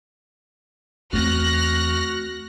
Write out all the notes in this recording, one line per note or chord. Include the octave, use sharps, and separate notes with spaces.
E2 A3 A#3 C4 F#4 F6 F#6 A#6